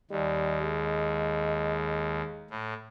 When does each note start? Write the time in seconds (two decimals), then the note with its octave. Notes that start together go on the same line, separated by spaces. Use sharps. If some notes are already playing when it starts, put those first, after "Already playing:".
0.11 D#2 G3 D#5
0.62 G#3
2.50 A2